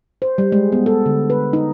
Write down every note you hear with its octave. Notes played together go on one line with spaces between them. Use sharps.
C5
G3
G#3
B3
A4
D3
B4
D#4